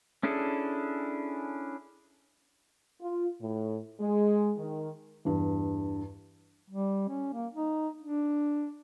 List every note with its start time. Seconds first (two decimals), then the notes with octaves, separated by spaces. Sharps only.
0.23 C#4 D4 E4 G#4 A4
3.00 F4
3.40 A2
3.99 G#3
4.57 D#3
5.25 E2 G2
6.70 G3
7.09 C#4
7.33 A#3
7.55 D#4
8.02 D4